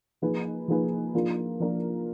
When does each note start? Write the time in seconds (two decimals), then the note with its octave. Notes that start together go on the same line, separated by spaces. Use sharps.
0.22 F3 A#3 D#4 G#4 B4
0.68 F3 A#3 D#4 G#4 B4
1.14 F3 A#3 D4 F4 A#4
1.60 F3 A#3 D4 F4 A#4